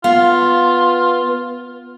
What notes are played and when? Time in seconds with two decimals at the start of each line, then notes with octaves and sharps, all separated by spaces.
0.04 B3 F4 F5